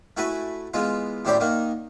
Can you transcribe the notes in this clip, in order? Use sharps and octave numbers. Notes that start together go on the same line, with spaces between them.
A3 E4 F#4 B4 F#5 G#5
E3 G#3 B3 F4
F#2 A2 E4 G4 C5 D5
D#3 A#3 D#4 F#5